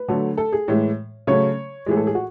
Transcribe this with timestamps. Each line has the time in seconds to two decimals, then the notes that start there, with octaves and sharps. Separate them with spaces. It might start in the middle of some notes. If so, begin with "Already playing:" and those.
Already playing: B4
0.08 D3 F#3 A3
0.37 A4
0.53 G#4
0.68 A2 E3 G#3
1.27 C#3 F#3 A3 C#5
1.86 A2 E3 G#3 G#4
1.97 A4
2.07 G#4
2.15 F#4